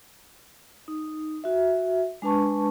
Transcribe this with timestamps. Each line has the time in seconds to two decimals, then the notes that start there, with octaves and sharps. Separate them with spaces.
0.88 D#4
1.44 F#4 E5
2.22 G#3 D4 B4 A5 C#6